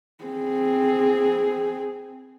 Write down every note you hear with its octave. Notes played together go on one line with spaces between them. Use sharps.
C4 G#4